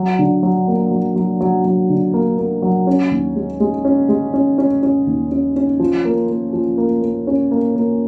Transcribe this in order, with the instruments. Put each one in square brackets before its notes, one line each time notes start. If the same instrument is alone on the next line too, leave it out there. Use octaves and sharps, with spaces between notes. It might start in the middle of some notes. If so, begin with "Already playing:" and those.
Already playing: [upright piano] F#3
D3
F#3
A#3
F#3
F#3
F#3
F#3
D3
A#3
A#3
F#3
C#4
D#2
G#3
G#3
C#4
G#3
C#4
C#4
C#4
D#2
C#4
C#4
F3
A#3
A#3
F3
A#3
A#3
C#4
A#3
A#3